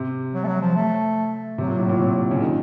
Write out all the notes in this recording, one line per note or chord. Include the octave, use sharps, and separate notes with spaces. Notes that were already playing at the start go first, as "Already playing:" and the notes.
Already playing: C3
F#3
A3
F#3
F3
A3
C3 F#3
A#2
A2
A#2
C3
C#3
D#3